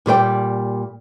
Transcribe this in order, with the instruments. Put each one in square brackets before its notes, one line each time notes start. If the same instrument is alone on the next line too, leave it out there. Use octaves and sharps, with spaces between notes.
[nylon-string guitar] A#2 G3 C5 G5